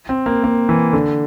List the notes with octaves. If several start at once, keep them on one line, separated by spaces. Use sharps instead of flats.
C4
A#3
A#3
E3
D3